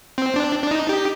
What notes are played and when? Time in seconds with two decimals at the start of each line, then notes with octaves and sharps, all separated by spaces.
0.18 C4
0.36 D4
0.63 D4
0.71 D#4
0.89 G4